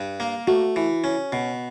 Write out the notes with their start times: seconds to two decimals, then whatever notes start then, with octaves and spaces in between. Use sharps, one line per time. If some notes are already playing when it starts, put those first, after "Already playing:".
Already playing: G2
0.20 A#3
0.47 A3 F#4
0.76 E3
1.04 C#4
1.32 B2